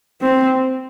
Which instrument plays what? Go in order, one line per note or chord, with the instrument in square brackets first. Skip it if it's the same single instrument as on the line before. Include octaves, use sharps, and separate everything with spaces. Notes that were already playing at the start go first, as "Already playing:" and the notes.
[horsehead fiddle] C4